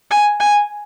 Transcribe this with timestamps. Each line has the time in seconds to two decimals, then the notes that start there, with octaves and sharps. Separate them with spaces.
0.11 G#5
0.40 G#5